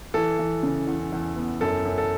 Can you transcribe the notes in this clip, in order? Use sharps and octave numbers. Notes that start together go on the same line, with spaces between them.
E3 A4
E3
C#3
E2
E2
B3
F#2 A4
F#2
A4